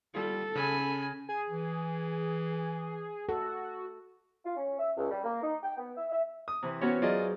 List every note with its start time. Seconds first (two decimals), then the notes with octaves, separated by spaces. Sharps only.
0.15 G3 F4 A4
0.55 C#3 C#4 G#5 B5
1.29 G#4 G#5
1.50 E3
3.29 F#4 A4
4.45 F4
4.56 C#4
4.78 E5
4.97 C#2
5.10 G3
5.24 A#3
5.42 D#4
5.63 G5
5.78 B3
5.97 E5
6.11 E5
6.48 D#6
6.63 C3 E3
6.81 B3 C#4 F#4 C#5
7.02 F#2 F#3 F4 G#4 D5 D#5